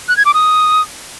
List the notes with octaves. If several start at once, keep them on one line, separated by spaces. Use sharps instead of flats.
F#6
G#6
D6
D#6